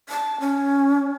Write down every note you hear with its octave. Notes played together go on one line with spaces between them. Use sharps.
A5
C#4